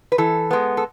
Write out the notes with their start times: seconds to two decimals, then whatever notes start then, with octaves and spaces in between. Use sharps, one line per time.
0.12 B4
0.18 E3 A4
0.51 G#3 B3
0.77 A4